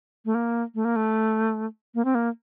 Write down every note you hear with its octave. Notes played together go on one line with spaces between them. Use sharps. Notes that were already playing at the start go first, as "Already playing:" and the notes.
A3
A#3
A3
A#3
A3
A#3
C4
A#3